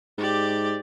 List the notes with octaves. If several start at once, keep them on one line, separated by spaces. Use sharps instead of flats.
G#2 G4 D5